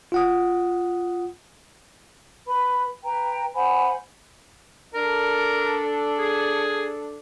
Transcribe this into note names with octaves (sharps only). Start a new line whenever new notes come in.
F4 F#5 D#6
B4 B5
B4 G5 A#5
C5 F#5 G#5 B5
D4 A4 A#4
G#4